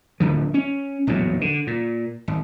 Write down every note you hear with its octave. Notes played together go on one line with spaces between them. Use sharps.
D1 D3 F3
C#4
A#1 E2 A2 F#3
D3
A#2
G#1